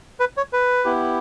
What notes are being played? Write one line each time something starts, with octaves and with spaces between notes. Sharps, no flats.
B4
C#5
B4
B3 E4 G4